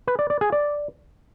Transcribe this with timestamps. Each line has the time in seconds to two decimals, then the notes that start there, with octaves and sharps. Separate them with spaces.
0.07 B4
0.19 D5
0.30 D5
0.41 G#4
0.52 D5